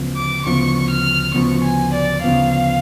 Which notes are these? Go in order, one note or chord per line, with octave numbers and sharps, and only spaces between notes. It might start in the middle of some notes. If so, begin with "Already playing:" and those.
Already playing: D2 C#3 F3 B3
D6
D2 C#3 F3 B3 C#6
F6
D2 C#3 F3 B3 C#6
G#5
D5
D2 C#3 F3 B3 F5